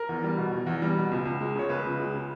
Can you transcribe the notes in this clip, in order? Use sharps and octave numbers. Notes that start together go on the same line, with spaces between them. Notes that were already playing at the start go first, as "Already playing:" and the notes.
Already playing: A#4
E2
G3
B2
E2
E2
G3
B2
C#2
C#2
G#3
C#3 C#5
C#2 B4
C#2
G#3
C#3